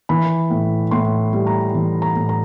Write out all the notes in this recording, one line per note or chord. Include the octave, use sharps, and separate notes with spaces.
E3 B5
A2
A2 C6
G3
A#5
E3
A#5
A2
A#5